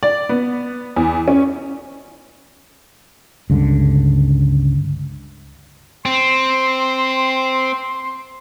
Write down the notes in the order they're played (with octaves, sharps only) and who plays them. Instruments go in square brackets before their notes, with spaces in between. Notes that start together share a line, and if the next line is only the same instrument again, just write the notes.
[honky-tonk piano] D5
B3
E2
C#4
[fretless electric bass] C#2 G2 D3
[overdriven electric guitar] C4 [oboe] C6